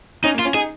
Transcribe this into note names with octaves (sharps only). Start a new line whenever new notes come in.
C#4 D#4
A#3
F4
C#4
D#4 G#4